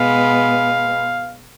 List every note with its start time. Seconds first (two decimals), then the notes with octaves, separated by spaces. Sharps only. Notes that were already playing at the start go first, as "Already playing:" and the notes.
Already playing: B2 G#3 B3 F5